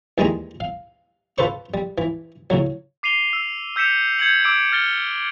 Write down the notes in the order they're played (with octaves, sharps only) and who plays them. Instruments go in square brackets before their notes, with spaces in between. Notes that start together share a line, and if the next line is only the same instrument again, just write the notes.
[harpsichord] D#2 E3 G3 G#3 G#5 A#5
F5
F4 A4 B4 C5 C#6
G3
E3
A2 C#3 F#3
[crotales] D6 C7 D#7 F7 G7
E6
E6 G6 B6 C#7 E7 F7
G6 G#6 C#7 F#7
D6 E6 D7
F6 A6 G7